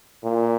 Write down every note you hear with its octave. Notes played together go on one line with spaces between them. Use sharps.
A#2